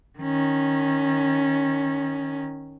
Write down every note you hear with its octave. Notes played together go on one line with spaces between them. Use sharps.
D#3 C#4